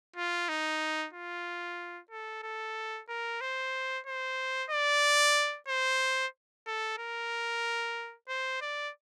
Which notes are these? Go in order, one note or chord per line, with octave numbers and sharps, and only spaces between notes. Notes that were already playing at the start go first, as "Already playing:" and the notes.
F4
D#4
F4
A4
A4
A#4
C5
C5
D5
C5
A4
A#4
C5
D5